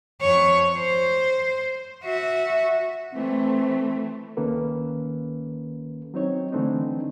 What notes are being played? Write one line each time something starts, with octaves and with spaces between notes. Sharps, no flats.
F2 C#5
C5
F#4 E5
E3 A3 C4
C2 D#3 A#3 C#4 A4 B4
F#3 C4 D#4 C#5
D3 E3 A3 C4 D4 D#4